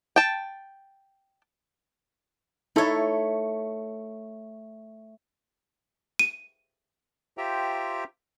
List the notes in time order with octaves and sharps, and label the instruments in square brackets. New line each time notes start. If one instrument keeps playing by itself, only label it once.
[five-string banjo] G5 A5
[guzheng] A3 C#5 [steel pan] D#4 E4 A4
[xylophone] D#7
[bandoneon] F4 G4 C5 E5 G5 A#5